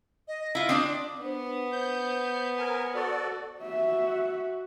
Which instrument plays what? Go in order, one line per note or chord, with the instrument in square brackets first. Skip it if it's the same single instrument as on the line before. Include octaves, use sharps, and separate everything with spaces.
[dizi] D#5
[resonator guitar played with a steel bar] E4 F4
[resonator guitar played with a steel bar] C4 D4 D5 [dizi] D#6
[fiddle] B3 [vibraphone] D4 C5
[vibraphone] C5 [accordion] G6
[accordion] A#4 G#5
F#4 A4 D5
[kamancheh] F#4 [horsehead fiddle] E5